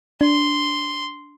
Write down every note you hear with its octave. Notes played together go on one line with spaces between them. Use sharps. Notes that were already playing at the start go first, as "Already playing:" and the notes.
D4 C6